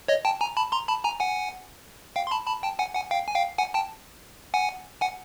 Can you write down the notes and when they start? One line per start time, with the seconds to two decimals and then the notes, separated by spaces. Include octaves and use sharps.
0.08 C#5 D#5
0.25 G5 A5
0.41 G#5 A#5
0.57 A5 B5
0.72 A#5 C6
0.88 A5 B5
1.04 G#5 A#5
1.20 F#5 G#5
2.16 F5 G5
2.27 C6
2.31 A5 B5
2.47 A5 B5
2.63 G5 A5
2.79 F#5 G#5
2.95 F#5 G#5
3.11 F5 G5
3.28 G#5
3.35 F5 G5
3.58 F#5 G#5
3.74 G5 A5
4.54 F#5 G#5
5.01 F#5 G#5